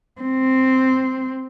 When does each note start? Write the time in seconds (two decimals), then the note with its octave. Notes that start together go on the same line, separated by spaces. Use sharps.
0.21 C4